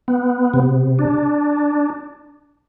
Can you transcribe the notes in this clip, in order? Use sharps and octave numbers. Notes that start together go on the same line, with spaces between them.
B3
C3
D4